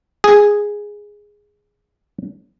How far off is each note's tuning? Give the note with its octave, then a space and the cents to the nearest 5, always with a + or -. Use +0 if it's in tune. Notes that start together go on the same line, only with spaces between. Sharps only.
G#4 -5